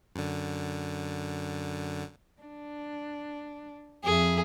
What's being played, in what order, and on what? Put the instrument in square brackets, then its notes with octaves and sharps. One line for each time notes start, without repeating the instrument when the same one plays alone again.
[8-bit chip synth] F#2 D3
[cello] D4
[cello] F2 E5 [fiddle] G#4